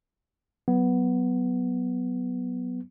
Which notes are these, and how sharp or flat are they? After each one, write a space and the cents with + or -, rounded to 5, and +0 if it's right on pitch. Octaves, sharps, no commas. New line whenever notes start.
F#3 +5 B3 +0